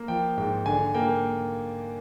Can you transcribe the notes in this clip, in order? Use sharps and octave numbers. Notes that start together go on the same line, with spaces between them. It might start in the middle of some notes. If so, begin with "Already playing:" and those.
Already playing: A#3
F3 G5
G#2 G5
D3 G#5
A#3 G5